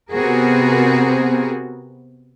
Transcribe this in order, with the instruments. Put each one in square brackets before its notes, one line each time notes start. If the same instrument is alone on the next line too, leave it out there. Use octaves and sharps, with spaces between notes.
[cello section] C3 B3 C4 F#4 G#4 A#4